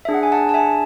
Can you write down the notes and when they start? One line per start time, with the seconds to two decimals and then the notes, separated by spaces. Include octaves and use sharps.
0.05 D4 G#4 E5
0.14 F#5
0.23 G#5
0.32 F#5 A5
0.49 A5
0.54 E5 G#5